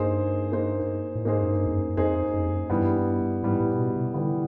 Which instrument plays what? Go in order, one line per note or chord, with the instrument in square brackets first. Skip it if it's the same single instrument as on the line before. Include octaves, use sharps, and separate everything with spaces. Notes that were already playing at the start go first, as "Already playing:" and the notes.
Already playing: [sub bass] G2 [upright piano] A#3 D#4 G#4 C5
[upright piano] A#3 D#4 G#4 C5
[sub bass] A2
[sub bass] G#2 [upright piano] A#3 D#4 G#4 C5
[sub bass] F#2
G2
F2
F#2
[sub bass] F2 [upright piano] A#3 D#4 G#4 C5
[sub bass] F#2
F2
F#2
[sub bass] G2 [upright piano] E3 G3 B3
[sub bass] G#2 [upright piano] E3 G3 B3
[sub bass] A2
A#2
B2
C3
[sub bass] D3 [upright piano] E3 G3 B3